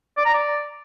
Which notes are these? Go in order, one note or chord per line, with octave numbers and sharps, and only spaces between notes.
D5
A#5
D5